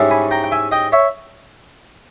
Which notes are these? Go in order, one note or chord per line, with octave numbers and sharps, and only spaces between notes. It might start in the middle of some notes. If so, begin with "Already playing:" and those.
Already playing: G#2 G3 C#4 E4
G#5 B5
G5 A#5
G5
E5 G#5
D#5 G5
C#5 E5